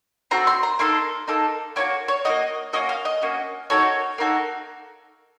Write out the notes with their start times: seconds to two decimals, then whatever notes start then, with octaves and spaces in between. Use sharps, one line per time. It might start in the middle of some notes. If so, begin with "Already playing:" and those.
0.31 C4 F#4 A4 A#5
0.47 C6
0.63 A#5
0.79 A#3 D#4 A4 C6
1.28 A#3 D#4 A4
1.76 A#3 D#4 F#4 C#5
2.08 C#5
2.25 D#4 F#4 D#5
2.29 A#3
2.73 A#3 C#4 F#4 D#5
2.89 F5
3.05 D#5
3.22 A#3 C#4 F#4
3.70 A#3 D#4 F#4 A4 C#5
4.18 A#3 D#4 F#4 A4